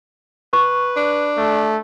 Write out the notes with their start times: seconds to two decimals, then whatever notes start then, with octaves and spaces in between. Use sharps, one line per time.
0.53 B4 C#6
0.96 D4
1.38 A3